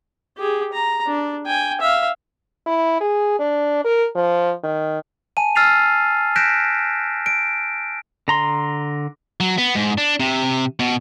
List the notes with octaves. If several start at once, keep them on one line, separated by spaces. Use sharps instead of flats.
G4 G#4
A#5
D4
G5 G#5
E5 F5
E4
G#4
D4
A#4
F3
D#3
G#5 A5 D#7
E6 F6 A6 C7 D#7 F7
F#6 G6 A#6 B6 D7 E7
D7
D3 A#5 C6
F#3
B3
G#2
D4
C3
B2